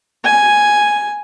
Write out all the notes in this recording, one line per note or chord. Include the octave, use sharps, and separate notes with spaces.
G#5